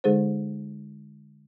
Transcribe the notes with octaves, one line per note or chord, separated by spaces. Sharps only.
D3 G#3 D#4 G#4 A4 C5